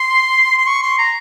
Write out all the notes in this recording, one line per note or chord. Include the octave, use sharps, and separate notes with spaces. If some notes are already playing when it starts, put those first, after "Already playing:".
Already playing: C6
C6
C#6
C6
A#5